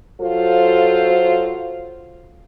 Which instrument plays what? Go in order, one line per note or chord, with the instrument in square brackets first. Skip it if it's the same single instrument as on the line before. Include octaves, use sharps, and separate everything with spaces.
[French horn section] F#3 F4 F#4 A4 C5